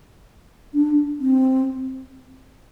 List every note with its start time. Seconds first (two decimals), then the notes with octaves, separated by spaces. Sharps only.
0.74 D4
1.20 C4